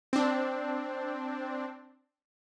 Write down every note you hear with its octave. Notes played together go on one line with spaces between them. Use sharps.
C4 D4